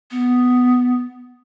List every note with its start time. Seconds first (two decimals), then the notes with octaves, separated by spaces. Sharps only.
0.11 B3